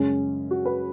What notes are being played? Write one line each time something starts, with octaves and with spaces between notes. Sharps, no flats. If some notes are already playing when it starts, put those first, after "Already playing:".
Already playing: F#2 C#3 G#3 C#4
F#4
B4